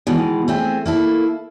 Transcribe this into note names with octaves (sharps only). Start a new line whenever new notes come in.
B2 D#3 E3 G#3
A3 C4 G#4
A#3 E4 A4